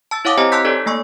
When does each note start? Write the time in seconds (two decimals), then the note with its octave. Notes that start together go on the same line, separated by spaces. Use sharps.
0.11 A5 E6 A6
0.25 E4 C#5 F5 F#5 D6 D#6
0.37 C4 G4 C5 D#5 G#5 A#5
0.52 A5 C6 E6 F#6 G6 B6
0.65 D#4 A4 C#5 D5
0.86 A3 A#3 G#5 C#6